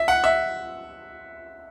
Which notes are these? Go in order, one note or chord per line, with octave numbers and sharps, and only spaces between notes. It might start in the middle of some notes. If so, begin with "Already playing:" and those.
Already playing: E5
F#5
E5